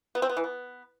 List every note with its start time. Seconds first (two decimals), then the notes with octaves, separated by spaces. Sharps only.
0.15 B3
0.22 C4
0.29 B3
0.37 E3
0.44 B3